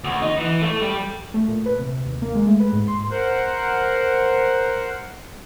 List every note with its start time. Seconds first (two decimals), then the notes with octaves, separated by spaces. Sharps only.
0.04 D2
0.22 D#4
0.38 E3
0.62 A3
0.81 G3
1.34 A3
1.48 A#2
1.66 B4
1.79 C3
2.05 D#2
2.22 A#3
2.35 G#3
2.47 A3
2.60 B4
2.73 G#2
2.88 C6
3.11 A#4 C5 F#5